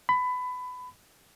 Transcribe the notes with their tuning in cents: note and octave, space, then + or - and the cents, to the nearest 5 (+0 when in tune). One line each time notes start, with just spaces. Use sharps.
B5 +20